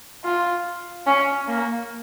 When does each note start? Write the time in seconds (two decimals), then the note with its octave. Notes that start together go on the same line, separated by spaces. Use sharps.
0.24 F4
1.06 C#4
1.47 A#3